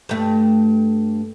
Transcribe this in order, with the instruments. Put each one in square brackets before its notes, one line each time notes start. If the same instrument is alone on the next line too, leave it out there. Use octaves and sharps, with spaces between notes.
[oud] G2 A3